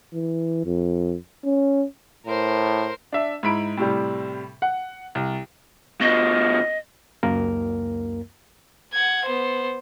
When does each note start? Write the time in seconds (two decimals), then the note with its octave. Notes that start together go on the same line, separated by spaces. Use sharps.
0.13 E3
0.65 F2
1.44 C#4
2.26 A2 A#4 C5
3.13 D4 E5
3.43 G#2 E4 B5 D7
3.77 A2 C3 G3
4.62 F#5
5.15 C2
6.01 B2 F3 D#5
7.23 C#2 F#2 A#3 A#4
8.93 F#5 G#6
9.25 B3 C5